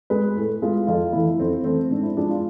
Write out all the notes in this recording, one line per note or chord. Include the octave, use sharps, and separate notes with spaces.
G#3 B4
A2
G#3 F4
F2 F4
E3 A3 E4
F2 C4
E3 A3 C4
G#2 D4
E4
F3 G#3 D4
F4